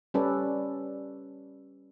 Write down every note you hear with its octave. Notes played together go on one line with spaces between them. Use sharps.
G3 C#4 A4 B4 D5